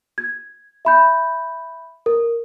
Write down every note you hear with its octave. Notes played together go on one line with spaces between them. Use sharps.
G#6
E5 B5 G6
A#4